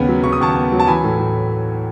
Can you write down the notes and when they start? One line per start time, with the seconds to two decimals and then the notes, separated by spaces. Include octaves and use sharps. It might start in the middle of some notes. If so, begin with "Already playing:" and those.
Already playing: D#2 C#3 B3 B5
0.08 F#3
0.24 C#3 C#6
0.33 D#6
0.41 D#2 A5 C#6
0.55 B3
0.72 F#3
0.80 A5
0.87 E3 G#5 B5
1.04 A2
1.19 A2